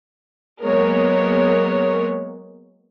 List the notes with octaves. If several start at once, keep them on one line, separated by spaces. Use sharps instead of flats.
F#3 G#3 A#3 B3 A#4 C#5